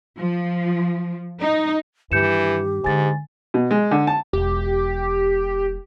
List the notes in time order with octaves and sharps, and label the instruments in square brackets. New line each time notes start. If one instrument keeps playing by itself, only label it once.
[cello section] F3
D#4
[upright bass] G2 D#3 [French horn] E3 [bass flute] G4 [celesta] G6 C#7 E7
[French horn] G#2 [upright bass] D3 G#3 [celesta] G#5 A6
[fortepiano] B2
G#3
D3
A5
[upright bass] E1 [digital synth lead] G4